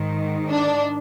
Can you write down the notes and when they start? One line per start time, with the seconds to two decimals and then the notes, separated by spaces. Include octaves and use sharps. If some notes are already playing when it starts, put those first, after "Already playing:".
Already playing: G#2 D#3
0.50 D4